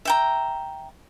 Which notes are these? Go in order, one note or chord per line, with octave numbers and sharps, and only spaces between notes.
E5 G5 A#5